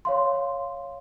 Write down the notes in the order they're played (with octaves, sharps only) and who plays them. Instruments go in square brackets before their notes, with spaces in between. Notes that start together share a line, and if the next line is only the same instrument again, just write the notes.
[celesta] C#5 F5 C6